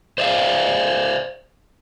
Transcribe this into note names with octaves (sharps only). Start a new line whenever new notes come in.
C5 D5 E5 F5